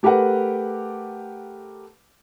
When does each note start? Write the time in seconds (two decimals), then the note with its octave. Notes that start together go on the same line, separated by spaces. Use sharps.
0.03 A3 G4 A#4 B4 F#5